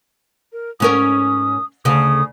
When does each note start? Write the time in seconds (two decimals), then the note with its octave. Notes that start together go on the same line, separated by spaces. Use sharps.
0.52 A#4
0.80 G#2 C#4 A#4 D#6
1.85 D2 C#3 D#6